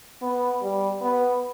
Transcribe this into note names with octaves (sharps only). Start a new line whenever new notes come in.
B3
G3
B3